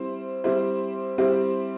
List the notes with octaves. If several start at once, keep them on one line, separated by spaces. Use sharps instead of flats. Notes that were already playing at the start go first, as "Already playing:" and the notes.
Already playing: G3 C4 E4 C5
G3 C4 E4 G4 C5
G3 C4 E4 G4 C5